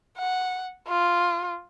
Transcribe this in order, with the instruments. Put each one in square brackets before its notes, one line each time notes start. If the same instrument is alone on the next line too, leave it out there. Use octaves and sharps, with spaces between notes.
[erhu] F#5
F4